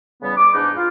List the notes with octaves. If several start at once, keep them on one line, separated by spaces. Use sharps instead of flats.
E2 C#3 G3 B3
D6
E2 G#2 D4 D#4 B4
F4